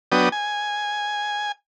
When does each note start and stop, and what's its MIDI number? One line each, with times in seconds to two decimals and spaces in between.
0.12 0.29 54
0.12 0.29 59
0.12 0.29 62
0.12 0.29 79
0.12 0.29 87
0.32 1.52 80